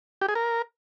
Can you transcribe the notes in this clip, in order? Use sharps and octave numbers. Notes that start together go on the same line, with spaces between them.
G4
G#4
A#4